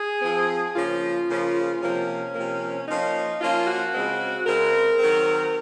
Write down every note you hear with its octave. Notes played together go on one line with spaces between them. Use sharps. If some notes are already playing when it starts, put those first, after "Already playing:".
Already playing: G#4
F3 C4
C#3 F3 A#3 C#4 F4
C#3 F3 A#3 C#4
C3 F3 A#3 C#4
C3 F3 A#3
F3 A#3 C#4 D#4
F3 A#3 C#4 F4
F#4
C#3 G#3 C4
C#3 G#3 C4 A#4
D#3 F#3 C4